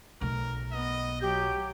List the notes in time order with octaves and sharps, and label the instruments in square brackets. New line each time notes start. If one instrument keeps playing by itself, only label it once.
[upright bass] B1 A3 [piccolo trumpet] A#4
[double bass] B3 [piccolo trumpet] D#5
[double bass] F#3 [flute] G4 [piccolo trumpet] G6